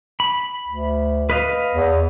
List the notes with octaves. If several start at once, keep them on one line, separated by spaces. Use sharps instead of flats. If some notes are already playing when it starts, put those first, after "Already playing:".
B5
D2
B4 D#5 F5
E2